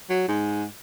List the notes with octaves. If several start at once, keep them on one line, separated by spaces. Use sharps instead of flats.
F#3
G#2